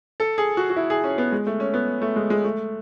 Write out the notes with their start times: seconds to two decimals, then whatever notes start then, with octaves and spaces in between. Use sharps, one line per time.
0.20 A4
0.38 G#4
0.57 F#4
0.70 F#4
0.76 E4
0.90 G#4
1.04 C#4
1.18 B3
1.32 G#3
1.47 A3
1.60 C#4
1.74 B3
2.02 A3
2.16 G#3
2.30 G#3
2.44 A3